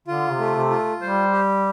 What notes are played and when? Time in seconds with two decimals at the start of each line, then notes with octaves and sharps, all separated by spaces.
0.07 D3 F4
0.31 C3
0.39 A3
0.55 C3
0.70 F4
1.01 G3 C5
1.32 G4